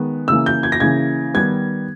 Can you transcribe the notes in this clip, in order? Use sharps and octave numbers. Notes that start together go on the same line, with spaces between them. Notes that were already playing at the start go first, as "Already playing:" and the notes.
Already playing: D#3 G#3 B3
C#3 E3 A#3 E6
G6
G#6
A#6
C#3 E3 A#3 G#6
D#3 G3 B3 G#6